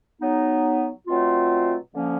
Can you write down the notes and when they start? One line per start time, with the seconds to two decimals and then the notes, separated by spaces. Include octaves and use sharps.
0.21 F#3 B3 D#4
1.07 B2 F#3 A3 C4 F4
1.93 D3 F3 A#3 C#4